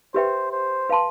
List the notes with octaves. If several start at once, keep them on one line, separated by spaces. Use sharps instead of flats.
G4 B4 C5 E5 G5
C5
B4 F5 A5 C6